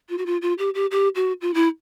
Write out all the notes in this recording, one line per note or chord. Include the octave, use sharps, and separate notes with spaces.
F4
F#4
F4
F4
G4
G4
G4
F#4
F4
E4